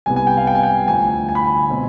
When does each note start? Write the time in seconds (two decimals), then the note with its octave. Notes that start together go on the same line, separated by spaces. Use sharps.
0.06 C2 C3 G3 B3 G#5
0.16 G#5
0.27 G5
0.37 F5
0.47 G5
0.55 G#5
0.63 G5
0.88 D2 D3 F3 G#5
1.29 G#5
1.35 B5
1.44 G#5
1.70 B2 G#3 C4